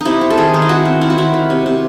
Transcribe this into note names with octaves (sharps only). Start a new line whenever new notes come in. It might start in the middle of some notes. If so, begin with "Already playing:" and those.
C3 D#4 E4
C4
A4
D#3 G#4
D#3 D#4
E4
C4 F#4
C4
D#3 E4
F#4
D#3 E4
D#3
C3
C3